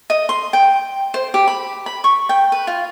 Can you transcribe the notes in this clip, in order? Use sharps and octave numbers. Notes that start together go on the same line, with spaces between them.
D#5
C6
G5
C5
G4
B5
B5
C#6
G5
B4
F4